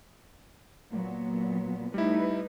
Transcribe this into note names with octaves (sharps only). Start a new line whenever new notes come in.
A#2 F#3 B3
G3 A3 D#4 E4 B4